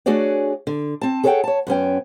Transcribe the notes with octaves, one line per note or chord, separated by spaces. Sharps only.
A3 D4 F#4 G#4 C#5 D5
D3
C4 A5
G#4 A4 C#5 D5 F#5 G5
C#5 A5
F#2 B3 C#4 G5